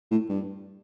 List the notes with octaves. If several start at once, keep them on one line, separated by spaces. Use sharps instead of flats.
A2
G2